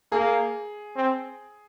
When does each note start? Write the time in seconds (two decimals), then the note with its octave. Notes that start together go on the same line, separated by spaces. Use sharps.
0.12 A#3 G#4
0.96 C4